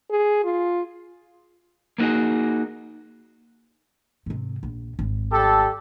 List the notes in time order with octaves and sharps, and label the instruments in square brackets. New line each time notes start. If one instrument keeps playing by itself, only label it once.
[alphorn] G#4
F4
[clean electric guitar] A#3 B3 D#4 F#4 G#4
[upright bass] G#2 C3
A#1
G#1
[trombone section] G3 G4 A4